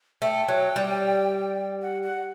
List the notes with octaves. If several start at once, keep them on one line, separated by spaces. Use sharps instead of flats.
A3 G5
F#3
G3
F#5
F#5